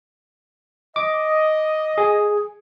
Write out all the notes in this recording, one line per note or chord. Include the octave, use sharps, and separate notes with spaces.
D#5 D6
G#4